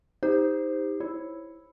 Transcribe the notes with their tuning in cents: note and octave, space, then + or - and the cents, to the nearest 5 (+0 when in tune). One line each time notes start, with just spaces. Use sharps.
D#4 +20 G4 +30 C5 -10
E4 +0 C#5 +0